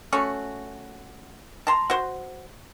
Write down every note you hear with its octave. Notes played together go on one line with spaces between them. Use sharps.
A3 C#4 F#4
A5 A#5 C6
F#4 C5